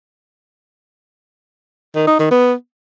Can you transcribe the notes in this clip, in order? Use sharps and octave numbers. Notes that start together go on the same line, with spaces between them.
D#3
D#4
D#3
B3